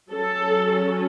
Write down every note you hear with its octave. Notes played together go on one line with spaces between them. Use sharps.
F#3 C#4 A4